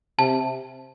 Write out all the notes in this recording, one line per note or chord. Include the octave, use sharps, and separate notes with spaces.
C3 A5